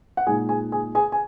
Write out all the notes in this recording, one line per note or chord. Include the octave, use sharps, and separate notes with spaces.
F#5
A#2 G#3 D#4 G#4 G#5
G#4 G#5
G#4 G#5
G#4 G#5
G#5